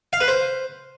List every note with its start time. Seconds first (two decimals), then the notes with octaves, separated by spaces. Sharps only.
0.13 F5
0.20 B4
0.28 C5